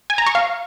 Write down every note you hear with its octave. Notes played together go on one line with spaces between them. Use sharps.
G#5
A#5
C#6
F5